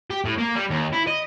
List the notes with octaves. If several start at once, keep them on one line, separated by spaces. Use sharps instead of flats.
G4
A2
A#3
G3
D#2
E4
D#5